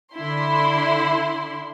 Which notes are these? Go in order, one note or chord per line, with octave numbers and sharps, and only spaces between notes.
D3 E4 C6